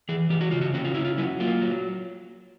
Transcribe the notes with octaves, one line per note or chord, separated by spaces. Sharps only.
E3 G#4
E3 G4
F#4
C#3 F4
F#4
C#4 F#4
F4
C#4 E4
F4
F#3 E4
A#3 F4
F#3